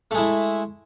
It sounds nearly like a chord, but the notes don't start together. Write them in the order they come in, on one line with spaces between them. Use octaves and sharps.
A3 G#3 E4